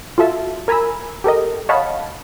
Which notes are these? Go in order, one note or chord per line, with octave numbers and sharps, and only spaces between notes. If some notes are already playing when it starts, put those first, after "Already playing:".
F4 F#4 A4 E5 A5
A#4 G#5 A#5 B5 E6
G4 A4 A#4 D#5
C#5 D#5 F5 F#5 A5 B5